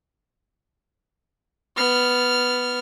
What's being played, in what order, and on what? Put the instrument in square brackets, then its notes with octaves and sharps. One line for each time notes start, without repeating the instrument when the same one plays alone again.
[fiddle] B3 F6